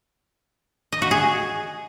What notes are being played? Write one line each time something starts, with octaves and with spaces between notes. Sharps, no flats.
D#5
F#4
G#4